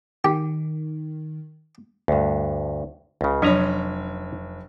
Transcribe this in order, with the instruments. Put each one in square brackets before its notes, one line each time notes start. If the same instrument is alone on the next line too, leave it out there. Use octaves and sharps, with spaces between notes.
[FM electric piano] D#3 [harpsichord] G4
[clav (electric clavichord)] D2 G2
C#2 C#3
[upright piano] F1 C#5 [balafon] F#3 D4 [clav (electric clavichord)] C#4 G#5 A#5